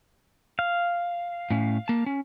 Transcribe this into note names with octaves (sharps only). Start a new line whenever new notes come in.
F5
A2 C#4
A#3 A5
C#4